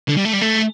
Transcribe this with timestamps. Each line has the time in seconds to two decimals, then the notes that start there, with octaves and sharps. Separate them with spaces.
0.08 D3
0.17 G3
0.25 A3
0.33 G3
0.42 A3